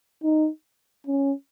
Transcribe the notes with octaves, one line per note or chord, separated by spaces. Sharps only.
D#4
C#4